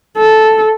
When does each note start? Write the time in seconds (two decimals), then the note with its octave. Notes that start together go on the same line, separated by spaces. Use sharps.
0.17 A4